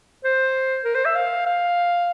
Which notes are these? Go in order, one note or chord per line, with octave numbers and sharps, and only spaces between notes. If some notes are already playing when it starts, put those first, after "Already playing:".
C5
A#4
C5
E5
F5
F5